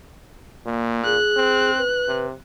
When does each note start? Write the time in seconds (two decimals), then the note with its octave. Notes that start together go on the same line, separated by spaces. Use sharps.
0.66 A#2 A#3
1.05 G#4 F#6
1.36 C4
1.78 B4
2.08 C3